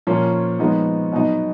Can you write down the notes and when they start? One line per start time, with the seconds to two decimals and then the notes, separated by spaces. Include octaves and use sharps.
0.07 A#2 F3 A#3 C#4 C#5
0.59 F3 G#3 B3 D#4
1.12 B2 F#3 B3 D#4 D#5